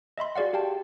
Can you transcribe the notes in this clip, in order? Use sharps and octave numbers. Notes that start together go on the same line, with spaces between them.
D#5 E5 B5 C6
F#4 G#4 D5 F5 F#5
G4 F5 G5 A5